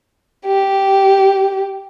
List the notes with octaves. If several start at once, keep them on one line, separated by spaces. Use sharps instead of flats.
G4